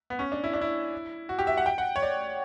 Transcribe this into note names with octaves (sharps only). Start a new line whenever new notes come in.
B3
C#4
D4
E4
D4
E4
F#4
G4
E5
F#5
G5
F#5
C#5
D5